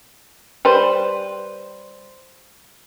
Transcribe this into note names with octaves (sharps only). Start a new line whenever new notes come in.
G3 B4 C5